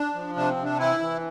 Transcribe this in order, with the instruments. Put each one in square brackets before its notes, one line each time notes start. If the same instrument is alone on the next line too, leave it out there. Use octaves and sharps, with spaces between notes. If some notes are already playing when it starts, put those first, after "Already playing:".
Already playing: [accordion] D4
F3
C3 D4
C4
C3
D4
E3 E4
E3